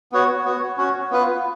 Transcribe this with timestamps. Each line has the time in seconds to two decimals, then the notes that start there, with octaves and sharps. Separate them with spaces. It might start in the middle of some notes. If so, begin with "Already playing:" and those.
0.12 B3 F#4 C#5
0.45 B3 F#4 C#5
0.78 C#4 F#4 C#5
1.11 B3 F4 B4